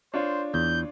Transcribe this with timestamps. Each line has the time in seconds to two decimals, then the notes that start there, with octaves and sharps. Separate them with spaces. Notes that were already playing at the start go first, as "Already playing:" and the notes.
0.14 D4 F4 C5 C#5
0.54 E2 G6